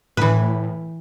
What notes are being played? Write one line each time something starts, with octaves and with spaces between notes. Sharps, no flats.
A2 E3 B4